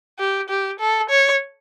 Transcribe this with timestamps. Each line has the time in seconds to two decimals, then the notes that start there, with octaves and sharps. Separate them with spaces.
0.19 G4
0.49 G4
0.80 A4
1.10 C#5